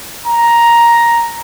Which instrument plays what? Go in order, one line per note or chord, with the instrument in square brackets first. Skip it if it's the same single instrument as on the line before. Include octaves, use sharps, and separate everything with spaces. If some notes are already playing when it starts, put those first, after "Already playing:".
[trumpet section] A#5